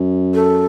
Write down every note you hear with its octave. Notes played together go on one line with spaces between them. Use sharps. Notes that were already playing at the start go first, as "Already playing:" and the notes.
Already playing: F#2
A4